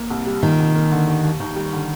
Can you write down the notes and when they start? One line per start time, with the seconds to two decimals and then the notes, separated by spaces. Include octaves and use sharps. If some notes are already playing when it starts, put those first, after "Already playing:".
Already playing: A#3
0.10 C2
0.26 G3
0.43 A#2 D#3
0.59 C2
0.75 A#3
0.92 D3
1.07 D#2
1.24 D#2
1.40 D#2 D#3
1.56 G3
1.73 D3